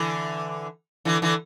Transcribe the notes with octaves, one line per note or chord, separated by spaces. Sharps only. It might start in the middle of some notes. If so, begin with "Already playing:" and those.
Already playing: D3 E3
D3 E3
D3 E3